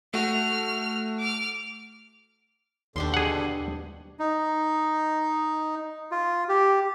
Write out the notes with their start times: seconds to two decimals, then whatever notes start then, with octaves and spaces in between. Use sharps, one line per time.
0.14 A3 F#4 F6
1.19 D6 F6
2.96 D#2 B2 D3 D4 G4 C6
3.14 G#4 F#5
4.19 D#4
6.11 F4
6.49 G4